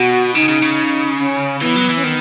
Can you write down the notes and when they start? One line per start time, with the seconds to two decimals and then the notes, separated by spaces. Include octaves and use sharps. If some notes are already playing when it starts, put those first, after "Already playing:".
Already playing: B2 F#4
0.35 C#3 D#4
0.49 C#3
0.63 C#3
1.19 C#4
1.61 E3 B3
1.76 F#3
1.89 E3
1.97 C#4
2.04 D#3 B3